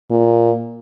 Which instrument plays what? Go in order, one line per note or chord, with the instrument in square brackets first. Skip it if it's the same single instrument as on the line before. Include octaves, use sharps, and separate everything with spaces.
[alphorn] A#2